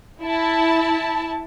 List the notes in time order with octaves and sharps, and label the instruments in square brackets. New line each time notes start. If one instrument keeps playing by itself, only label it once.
[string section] E4 A5